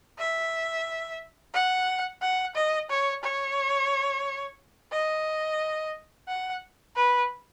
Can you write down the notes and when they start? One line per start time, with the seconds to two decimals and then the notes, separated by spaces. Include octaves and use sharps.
0.19 E5
1.53 F#5
2.21 F#5
2.55 D#5
2.89 C#5
3.23 C#5
4.91 D#5
6.28 F#5
6.96 B4